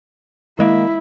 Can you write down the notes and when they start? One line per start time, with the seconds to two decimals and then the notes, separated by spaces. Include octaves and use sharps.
0.59 D#3 G#3 A#3 E4